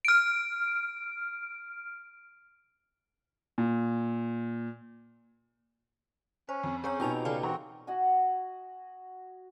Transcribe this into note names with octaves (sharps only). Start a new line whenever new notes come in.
F6 D7
A#2
C#4 C5
F2
C4 C#4 G#4 C#5 A#5
B2 D#4 F4 G4 A5 F7
C#3 A4 D5 F5 G#5 A5
E3 C4 F#4 D#5 A#5
F#4 D#5 F#5 G#5